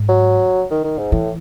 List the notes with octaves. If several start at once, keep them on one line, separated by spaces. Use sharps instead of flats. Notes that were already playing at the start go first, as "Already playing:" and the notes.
Already playing: G#2
F#3
D#3
D#3
G#2
A2 E3